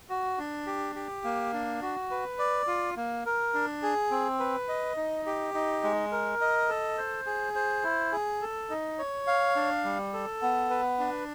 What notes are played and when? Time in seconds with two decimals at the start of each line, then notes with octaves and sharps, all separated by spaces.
0.09 F#4
0.38 D4
0.67 G4
0.95 G4
1.24 A#3
1.53 D4
1.82 F#4
2.11 B4
2.39 D5
2.67 F4
2.96 A#3
3.26 A#4
3.54 D4
3.82 G#4
4.11 C4
4.40 B4
4.68 D#5
4.97 D#4
5.26 G4
5.54 D#4
5.83 G#3
6.12 A#4
6.41 D#5
6.69 A4
6.98 C5
7.26 G#4
7.55 C5
7.84 E4
8.12 G#4
8.42 A4
8.70 D#4
8.99 C#5
9.27 F5
9.56 D4
9.84 G3
10.13 A4
10.42 B3
10.70 B4
10.99 D4